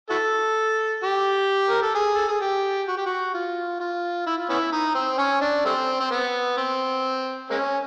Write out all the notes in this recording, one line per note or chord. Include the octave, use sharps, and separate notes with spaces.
E4 F#4 A4
G4
A#4
A4
G#4
A4
G#4
G4
F#4
G4
F#4
F4
F4
E4
F4
B3 C#4 E4
D#4
C4
C#4
D4
G3 A3 C4
C4
B3
C4
G#3 A#3 C#4